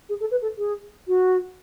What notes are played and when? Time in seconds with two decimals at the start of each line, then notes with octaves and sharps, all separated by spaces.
0.09 G#4
0.20 A4
0.31 B4
0.42 A4
0.58 G#4
1.08 F#4